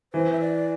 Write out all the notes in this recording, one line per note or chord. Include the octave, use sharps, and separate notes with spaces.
E3 C5
E5
D5